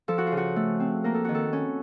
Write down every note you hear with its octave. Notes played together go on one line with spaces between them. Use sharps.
F3 A4
F#4
F4
C#3
F#4
A3
C4
A#3 A#4
A4
D#3 F#4
A4
C#4